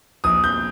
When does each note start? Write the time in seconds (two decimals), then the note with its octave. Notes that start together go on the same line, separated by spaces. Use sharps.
0.24 A#1 D#6
0.44 G6